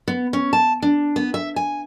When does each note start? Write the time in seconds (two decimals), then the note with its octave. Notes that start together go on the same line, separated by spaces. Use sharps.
0.08 B3
0.33 C#4
0.53 A5
0.82 D4
1.16 B3
1.34 E5
1.56 G#5